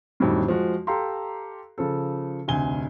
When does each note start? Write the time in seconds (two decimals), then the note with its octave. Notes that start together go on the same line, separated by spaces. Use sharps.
0.20 F2 A2 D3 D#3 F#3 G3
0.48 F3 G#3 F#4
0.87 G4 A4 F5 A#5 C6
1.78 C#3 F3 A4
2.48 F1 D2 G#5 G7